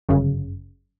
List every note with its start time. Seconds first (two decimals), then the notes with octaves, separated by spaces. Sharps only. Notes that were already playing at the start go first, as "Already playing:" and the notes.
0.09 G1 F#2 C#3